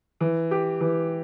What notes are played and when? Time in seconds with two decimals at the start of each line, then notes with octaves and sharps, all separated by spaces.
0.21 E3
0.51 G4
0.81 E3